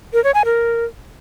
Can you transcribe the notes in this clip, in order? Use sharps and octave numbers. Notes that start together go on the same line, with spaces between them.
A#4
C#5
G#5
A#4